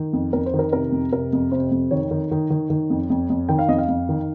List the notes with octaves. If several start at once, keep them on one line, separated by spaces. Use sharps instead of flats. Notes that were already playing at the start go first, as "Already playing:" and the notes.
Already playing: D#3
F2
F2 A#4
C5
D#3
A#4
C3 A#4
F2
C3 A#4
F2
C3 C5
F2
D#3 C#5
D#3
D#3
D#3
D#3
F2
F2
F2
D#3 G5
F5
F2 D#5
F5
F2
D#3